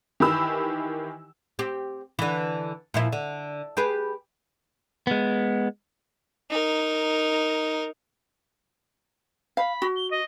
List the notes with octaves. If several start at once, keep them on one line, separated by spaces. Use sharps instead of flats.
D#3 E3 G4 B5 E6
C4 G4
D3 E3
A#2 F3 E4
D3
G4 G#4 B4
G#3 B3
D#4 A#4
F5 B5
F#4
G7
D#5